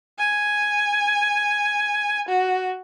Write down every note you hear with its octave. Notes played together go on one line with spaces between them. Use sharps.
G#5
F#4